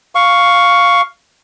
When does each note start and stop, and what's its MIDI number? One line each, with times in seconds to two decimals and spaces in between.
0.15 1.01 77
0.15 1.01 85